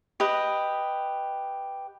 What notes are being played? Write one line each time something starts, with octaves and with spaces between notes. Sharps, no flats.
G4 B4 D#5